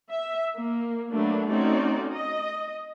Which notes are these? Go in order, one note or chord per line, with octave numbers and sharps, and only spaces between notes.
E5
A#3
F#3 A3 A#3 D4 B4
A3 C4 C#4 D#4 F#4 D5
D#5